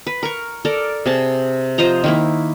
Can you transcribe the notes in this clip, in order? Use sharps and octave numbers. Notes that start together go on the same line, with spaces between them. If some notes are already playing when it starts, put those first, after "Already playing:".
B4
A#4 C#6
A4 A#4 D5
C3 G#4 A5
F3 C5 D#5 A#5
D#3 A#3 E4